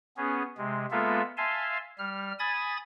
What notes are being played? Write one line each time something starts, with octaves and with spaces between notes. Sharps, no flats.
B3 C#4 G#4
C3 G#3
G#3 A#3 B3 F4 A4 E5
E5 F5 G#5 A5 C6
G3 F6
G#5 B5 D#6 G#6 A6